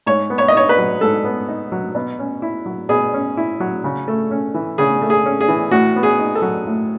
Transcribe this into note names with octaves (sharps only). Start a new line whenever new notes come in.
G#2 C#5
B3
C#5
D#5
D#4 C#5
B4
F#3
G#2 A4
B3
D#4
F#3
B2
C#4
E4
F#3
B2 G#4
C#4
E4
F#3
C#3
A3
C#4
E3
C#3 G#4
A3
G#4
C#4
G#4
E3
A2 F#4
B3
G#4
D#4
A4
F#3
A2